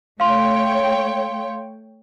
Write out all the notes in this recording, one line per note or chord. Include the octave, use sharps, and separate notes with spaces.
A3 C#5 F5 G5 C6